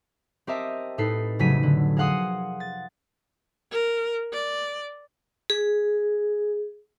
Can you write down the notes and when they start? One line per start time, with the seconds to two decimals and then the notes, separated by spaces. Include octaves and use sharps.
0.47 C4 G4 A#4 D#5 E5 A5
0.98 A2 D#4 A4 B4 C7
1.39 F1 C#3 F#3 A3 B6 D#7
1.63 D3
1.97 G#4 A#4 F5 F#5 C6 D#6
2.60 A6
3.72 A#4
4.33 D5
5.50 G#4